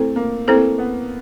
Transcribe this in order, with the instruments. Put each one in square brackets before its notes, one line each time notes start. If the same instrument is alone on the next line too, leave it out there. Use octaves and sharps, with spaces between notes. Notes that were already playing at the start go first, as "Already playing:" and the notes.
Already playing: [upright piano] A3 [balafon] C4 E4 A4 C5
[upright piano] A#3
[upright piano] A#3 [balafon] C4 E4 A4 C5
[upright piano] B3